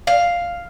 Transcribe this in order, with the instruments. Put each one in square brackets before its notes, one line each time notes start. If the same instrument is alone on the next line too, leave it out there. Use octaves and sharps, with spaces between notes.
[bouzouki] F5